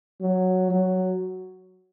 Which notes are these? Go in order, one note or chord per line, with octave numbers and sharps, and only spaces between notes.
F#3
F#3